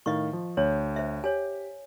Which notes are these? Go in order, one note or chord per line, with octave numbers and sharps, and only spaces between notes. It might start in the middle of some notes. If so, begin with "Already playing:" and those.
A2 D#3 D#5 F5 C#6
F3
D2 C#5
C5 E5
G4 C#5 G#5